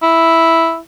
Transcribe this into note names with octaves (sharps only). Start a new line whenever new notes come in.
E4